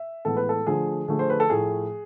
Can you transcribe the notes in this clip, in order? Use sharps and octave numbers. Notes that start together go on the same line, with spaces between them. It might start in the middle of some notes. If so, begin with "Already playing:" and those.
Already playing: E5
A2 E3 G#3 B3 A4
B4
A4
D3 F3 A3 G#4
D3 F3 A3 G#4
C5
B4
A4
A2 F3 A3 G#4